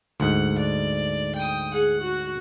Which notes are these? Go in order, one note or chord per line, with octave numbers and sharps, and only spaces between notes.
D2 G#2 F#5
D5
G5 D#6
G#4 F#5
F#4